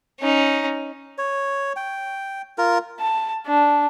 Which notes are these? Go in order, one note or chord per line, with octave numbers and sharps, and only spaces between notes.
C#4 D#4
C#5
G5
F4 A#4
A5
D4